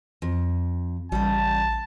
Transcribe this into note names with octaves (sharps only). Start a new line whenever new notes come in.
F2
A1 C#3 G3 A5